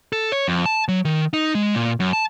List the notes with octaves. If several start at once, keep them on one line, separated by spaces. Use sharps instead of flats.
A4
C#5
F2
A5
F#3
D#3
D#4
G#3
A#2
F#2
A5